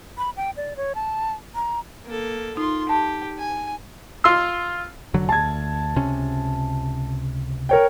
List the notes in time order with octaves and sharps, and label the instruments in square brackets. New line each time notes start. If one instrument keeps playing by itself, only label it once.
[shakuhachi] B5
G5
D5
C#5
A5
A#5
[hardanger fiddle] A#3 A4
[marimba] D#4 [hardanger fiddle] F4 C6
[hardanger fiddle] G4 [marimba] A5
[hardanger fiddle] G#5
[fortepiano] F4 C6 E6
[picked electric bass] F1 D3 F#3
[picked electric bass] D2 [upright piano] A5 G#6
[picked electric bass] C#2 C3 C#4
[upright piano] A#4 C#5 G5